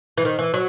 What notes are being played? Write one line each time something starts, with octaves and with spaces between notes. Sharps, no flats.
E3
D#3
E3
F#3